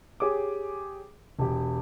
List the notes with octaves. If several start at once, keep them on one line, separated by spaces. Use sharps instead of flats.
G4 G#4 C#5 D6
E1 G4